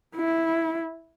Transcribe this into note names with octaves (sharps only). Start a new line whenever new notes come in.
E4